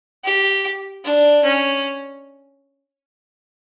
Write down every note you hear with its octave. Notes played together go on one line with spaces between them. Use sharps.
G4
D4
C#4